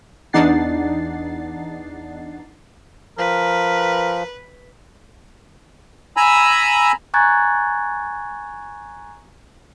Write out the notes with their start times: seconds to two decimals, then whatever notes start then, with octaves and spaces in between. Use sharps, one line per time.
0.33 E2 D4 D#4 F#5 A6 C7
3.18 F3 A#4 B4
6.17 G#5 A#5 B5 E6
7.14 G#5 A#5 C#6 F#6 G#6 A6